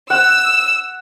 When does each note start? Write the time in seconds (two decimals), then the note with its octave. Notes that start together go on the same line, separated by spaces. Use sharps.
0.10 F#5 E6